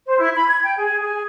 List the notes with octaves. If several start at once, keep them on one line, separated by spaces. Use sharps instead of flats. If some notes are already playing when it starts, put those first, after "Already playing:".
C5
E4
B5
G#6
G5
G#4
G#4